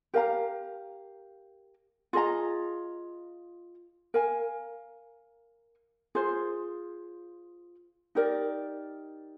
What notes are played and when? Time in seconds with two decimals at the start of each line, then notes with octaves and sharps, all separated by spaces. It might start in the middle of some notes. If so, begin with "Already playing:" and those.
0.14 G4 A#4 F5 A#5
2.13 F4 G#4 D#5 A#5
4.14 A#4 F5 G#5
6.15 F4 G#4 C5
8.15 D#4 G4 A#4 D5